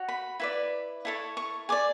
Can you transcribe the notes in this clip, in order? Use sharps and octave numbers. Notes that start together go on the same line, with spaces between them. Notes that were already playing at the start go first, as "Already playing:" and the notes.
Already playing: F#4 C#5
B5
E4 B4 D5
E4 A4 C#5
C#6
G#4 D5 D6